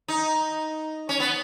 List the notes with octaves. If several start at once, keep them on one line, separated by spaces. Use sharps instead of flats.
D#4
C#4
B3